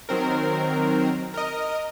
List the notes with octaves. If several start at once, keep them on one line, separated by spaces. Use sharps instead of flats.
D#3 F#3 C4 A#4
A#4 D#5